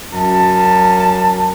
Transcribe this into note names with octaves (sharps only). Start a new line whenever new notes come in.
F#2 A5